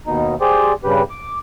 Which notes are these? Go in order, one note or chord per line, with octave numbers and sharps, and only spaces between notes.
D#2 B2 D#4
G4 G#4 C5 D5
G2 C#3 G4 B4
D6